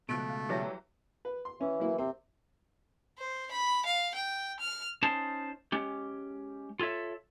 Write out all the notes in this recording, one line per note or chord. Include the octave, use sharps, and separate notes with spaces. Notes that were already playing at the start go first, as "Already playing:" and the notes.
C#2 B2 F3 A3 F#6 D7
F5
E3 F#3 G3 G#4 C#5 E5
B4
C6
E3 C#4
F#3 A#3 E4
C3 C4
C5
B5
F5
G5
F6
C#4 D#4 C5 A5
G#3 C#4 G4
F4 A4 C#5 E5